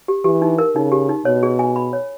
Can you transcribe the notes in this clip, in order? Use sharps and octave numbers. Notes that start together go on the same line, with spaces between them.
G4
E3 G4
D#4
A#4
C#3 D#4
G4
D#4
B2 C#5
G#4
G#5
B5
C#5